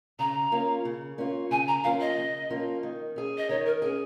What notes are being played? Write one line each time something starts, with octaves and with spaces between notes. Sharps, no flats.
C#3 A#5
A#3 C#4 F4
C#3
A#3 C#4 F4
C#3 G#5
A#5
F3 A#3 C#4 F4 F5
D#5
C#3
F3 A#3 C#4 F4
D#3
C#4 G#4
D#5
D#3 C#5
A#4
C#4 G#4 A#4